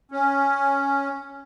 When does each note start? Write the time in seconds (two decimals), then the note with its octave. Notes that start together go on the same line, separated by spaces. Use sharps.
0.11 C#4